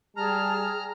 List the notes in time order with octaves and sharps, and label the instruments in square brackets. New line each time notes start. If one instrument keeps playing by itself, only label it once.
[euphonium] G3 [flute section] G#4 A5 [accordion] A#5 [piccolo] F6